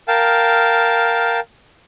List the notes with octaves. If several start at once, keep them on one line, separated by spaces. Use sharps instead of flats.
A#4 F5 G5 A5